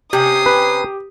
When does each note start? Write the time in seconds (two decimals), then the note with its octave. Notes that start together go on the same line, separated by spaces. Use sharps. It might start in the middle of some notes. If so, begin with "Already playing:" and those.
0.13 C3 C#4 G4 D#6 C7
0.46 B4